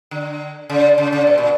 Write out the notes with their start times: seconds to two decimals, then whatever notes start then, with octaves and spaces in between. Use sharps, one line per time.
0.11 D3
0.70 C#3
0.98 C#3
1.12 C#3
1.27 B2
1.38 A#2